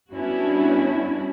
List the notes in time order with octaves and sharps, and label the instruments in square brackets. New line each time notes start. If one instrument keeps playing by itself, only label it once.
[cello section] G3 B3 C#4 D4 E4 F#4